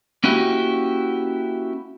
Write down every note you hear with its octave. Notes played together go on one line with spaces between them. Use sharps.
A#3 C#4 E4 F#4 G4